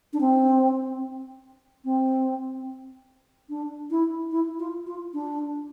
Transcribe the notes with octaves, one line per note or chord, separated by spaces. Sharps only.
D4
C4
C4
D4
E4
E4
F4
F4
D4